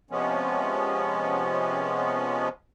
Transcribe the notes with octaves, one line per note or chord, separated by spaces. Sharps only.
C3 F3 G#3 B3 C#4